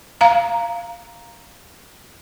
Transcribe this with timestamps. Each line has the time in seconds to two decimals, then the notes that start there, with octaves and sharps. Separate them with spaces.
0.21 F5 A#5